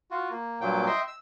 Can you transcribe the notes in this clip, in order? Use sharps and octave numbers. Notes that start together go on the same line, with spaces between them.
F4 F#4
A#3
G2 A#2 F#3 A#3 G5
D#5 E5 G5 C6
E6